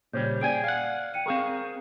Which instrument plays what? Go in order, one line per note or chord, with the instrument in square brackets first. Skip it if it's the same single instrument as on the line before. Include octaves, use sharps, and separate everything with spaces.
[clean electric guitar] A#2 C#3 G3 [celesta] C5 C#5 G6
[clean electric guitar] G#4 G5 G#5 [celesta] D5 D7
[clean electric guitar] F5 F#5
[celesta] G5 C#7 D#7
[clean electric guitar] C4 G#4 A#4 [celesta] F5 C#6